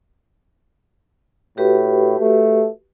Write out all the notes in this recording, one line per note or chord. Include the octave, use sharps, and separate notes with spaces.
A2 F#4 G4 B4
A3